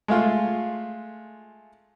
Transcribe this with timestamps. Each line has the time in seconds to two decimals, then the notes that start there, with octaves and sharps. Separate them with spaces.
0.08 G#3 A3 F4